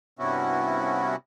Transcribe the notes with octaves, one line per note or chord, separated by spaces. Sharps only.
G2 C3 B3 C#4 E4 F#4